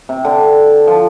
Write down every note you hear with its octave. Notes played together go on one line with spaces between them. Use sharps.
C3
D3
F3